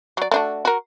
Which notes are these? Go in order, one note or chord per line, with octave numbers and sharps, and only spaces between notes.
F#3 D5
A3 D4 F#4
F#4 A#4